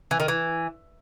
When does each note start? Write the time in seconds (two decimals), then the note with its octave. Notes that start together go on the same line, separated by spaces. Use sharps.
0.11 E3
0.20 D#3
0.28 E3